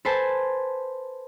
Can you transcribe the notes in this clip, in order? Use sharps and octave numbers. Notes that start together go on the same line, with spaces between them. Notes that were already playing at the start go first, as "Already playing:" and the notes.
A4 B4 C5 G#5 A5